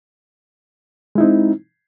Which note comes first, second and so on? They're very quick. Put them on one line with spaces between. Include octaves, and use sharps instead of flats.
G#3 E4 D#4 C4